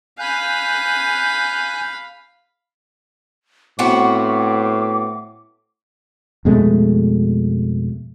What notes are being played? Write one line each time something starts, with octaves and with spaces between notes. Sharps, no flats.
F5 G#5 B5 F#6 G6
A2 B3 C4 F#4 D6
F2 B2 G#3 A3